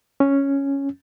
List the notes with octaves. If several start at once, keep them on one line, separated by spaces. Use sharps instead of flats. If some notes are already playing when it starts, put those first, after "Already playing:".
C#4